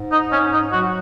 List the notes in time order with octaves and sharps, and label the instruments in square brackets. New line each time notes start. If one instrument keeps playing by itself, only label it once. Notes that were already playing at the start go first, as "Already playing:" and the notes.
Already playing: [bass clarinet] G#2
[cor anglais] D#4
C#4
D#4
[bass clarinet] F#3 [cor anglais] F#4